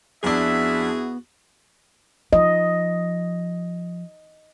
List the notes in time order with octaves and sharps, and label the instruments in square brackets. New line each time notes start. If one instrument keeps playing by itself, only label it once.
[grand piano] F2 D4 [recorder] B3 [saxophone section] E4 F#4 G#4 [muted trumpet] E5
[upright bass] F3 [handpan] D#5